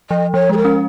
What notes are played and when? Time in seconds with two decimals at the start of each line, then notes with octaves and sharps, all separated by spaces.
0.10 F3 D#5
0.34 F3 C#5
0.49 G#3 G#4
0.57 A#4
0.65 C#4